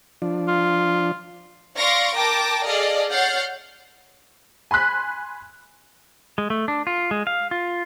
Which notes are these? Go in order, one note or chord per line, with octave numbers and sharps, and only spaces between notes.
F3 D4
F4
D5 F5 C6 C#6 A#6 D7
A#4 G5 A5 D6 A#6
G#4 A4 D5 D#5 F5
C#5 F#5 F6 G6 A6 C7
G#5 B5 C6 F#6 B6
G#3
A3
D4
F4
G#3
F5
F4